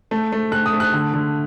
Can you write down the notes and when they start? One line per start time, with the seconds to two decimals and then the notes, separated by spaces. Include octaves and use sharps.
0.11 A3
0.32 A3
0.52 A3 F#6
0.66 D#6
0.73 A3
0.80 F#6
0.93 D3
1.14 D3